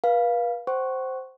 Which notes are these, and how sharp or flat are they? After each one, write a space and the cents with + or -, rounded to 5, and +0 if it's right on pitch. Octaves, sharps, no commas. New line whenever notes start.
B4 -40 F5 +0
C5 +0 F#5 +40 C#6 -5